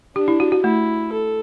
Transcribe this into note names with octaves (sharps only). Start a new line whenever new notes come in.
D4 G4
E4
F#4
F#4
A3 E4
A4